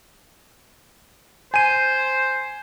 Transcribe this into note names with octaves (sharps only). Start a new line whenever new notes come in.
C5 G#5 D#7